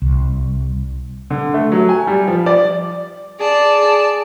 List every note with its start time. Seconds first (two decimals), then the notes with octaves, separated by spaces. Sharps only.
0.02 C2
1.30 D3
1.54 A3
1.72 F#3
1.89 G#5
2.07 G3
2.28 F3
2.46 D5
3.40 G#4 D5 A5